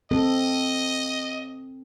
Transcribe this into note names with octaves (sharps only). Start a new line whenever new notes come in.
C4 A4 D#5